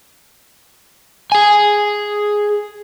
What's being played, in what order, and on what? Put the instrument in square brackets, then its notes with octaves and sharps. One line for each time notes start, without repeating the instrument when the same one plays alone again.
[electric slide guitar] G#4 G#5